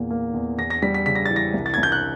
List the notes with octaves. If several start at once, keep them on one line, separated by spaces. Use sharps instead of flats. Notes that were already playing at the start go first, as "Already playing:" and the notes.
Already playing: E2 A#2 A#3
A#3
E2
E2 A#6
A#6
G3 B6
B6
C#3 B6
A#6
E3 A6
A#6
C2
A6
G#6
C2
G6
F#6